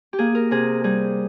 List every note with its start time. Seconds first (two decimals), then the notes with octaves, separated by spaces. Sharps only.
0.13 G4
0.18 A#3 G#4
0.35 A#4
0.51 C3 G#4
0.84 G3 G#4